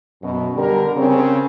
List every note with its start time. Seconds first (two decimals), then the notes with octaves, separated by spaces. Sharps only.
0.22 F#2 B2
0.57 D3 G3 A#4
0.97 C#3 C4 C#4